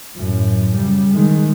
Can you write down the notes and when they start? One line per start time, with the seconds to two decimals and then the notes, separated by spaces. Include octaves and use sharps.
0.14 F#2 A2
0.74 C#3 G3
1.11 D#3 G#3